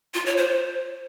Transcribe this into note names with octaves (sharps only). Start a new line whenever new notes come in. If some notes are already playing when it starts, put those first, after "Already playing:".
F4
C#5
C5